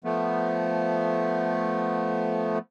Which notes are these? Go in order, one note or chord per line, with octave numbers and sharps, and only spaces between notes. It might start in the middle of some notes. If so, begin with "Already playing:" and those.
F3 A3 B3